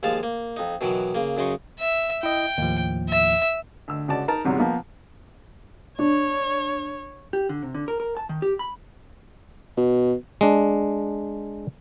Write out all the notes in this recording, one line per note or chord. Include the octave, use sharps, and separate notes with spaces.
D#2 F3 G#3 F5 A5
A#3
F2 D#4
B2 D#3 E3 F#3
C#3 A#3
F#2 C#3 D#4 C6 C#6
E5
E4 D#5 G5
D#2 A2 F3
E5
D2 E6
C#2 F#4 D5 A5
D#4 A#4 A5
E2 G#2 C3 F#3 G3
F3 A#3 B3
D4 C#5
G4
D3
C3
D3
A#4
A#4
A5
D#3
G4
B5
B2
G#3 D4